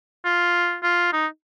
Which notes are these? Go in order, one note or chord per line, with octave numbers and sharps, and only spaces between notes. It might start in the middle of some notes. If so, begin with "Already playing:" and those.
F4
F4
D#4